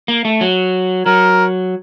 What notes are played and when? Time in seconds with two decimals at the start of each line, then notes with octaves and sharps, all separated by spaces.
0.08 A#3
0.25 A3
0.41 F#3
1.06 F#3 A#4